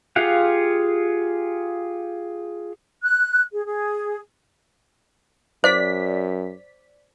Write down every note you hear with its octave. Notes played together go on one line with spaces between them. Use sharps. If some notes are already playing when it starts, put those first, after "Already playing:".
F4 G4 G#4 F5 F#5
F#6
G#4
G#4
F#2 C5 D5 B6